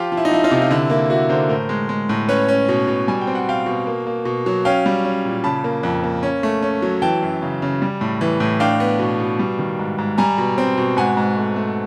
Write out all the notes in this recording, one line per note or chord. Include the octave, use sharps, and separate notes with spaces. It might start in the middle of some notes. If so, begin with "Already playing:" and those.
Already playing: F3 F4 G4
F3
E4
D#4
F3 E4
D#4 F4
C3
F4
D3 E4
A#3 E4
A#3 E4 F#4
D3 A#4 C5
A2 A#4 C5
G#3
G#3
A2
C#4 B4 C#5
C#4
B2
B2
G3 G#5
G5
C4
F#5
B2 F5 G5
B2
A#3
A#3
B2
F#3
C#4 F5 G5
G3
C#4
A#2
C#3 A5 B5
A#3
F2
A#3
C#4
A3
C#4
F#3
E3 G5 A5
F#2
C#3
C#3
G3
A2
E3
A2
D4 F5 G5
B3
B2
B2
G3
D#3
G#2
G#2
G3 G#5 A#5
B2
C4
B2
G#2 F#5 G#5
G#2
A3
A3